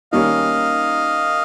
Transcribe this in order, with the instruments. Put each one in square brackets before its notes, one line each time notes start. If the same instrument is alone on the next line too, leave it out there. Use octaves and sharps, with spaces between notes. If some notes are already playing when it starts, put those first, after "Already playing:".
[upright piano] D#3 G3 A#3 C#4 [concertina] D#5 F5